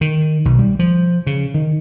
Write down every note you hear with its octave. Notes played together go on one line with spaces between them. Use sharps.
D#3
B1
G3
F3
C#3
D#3